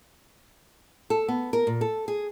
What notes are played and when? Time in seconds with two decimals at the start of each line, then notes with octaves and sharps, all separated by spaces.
1.10 A4
1.28 B3
1.53 A#4
1.67 A#2
1.81 A4
2.08 G#4